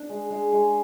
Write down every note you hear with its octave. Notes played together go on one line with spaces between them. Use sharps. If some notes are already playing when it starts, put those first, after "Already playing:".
Already playing: D4
G#3
G#3
G#3